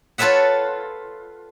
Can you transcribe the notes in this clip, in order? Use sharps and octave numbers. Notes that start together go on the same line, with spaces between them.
F4 A4 B4 C#5 E5 F#5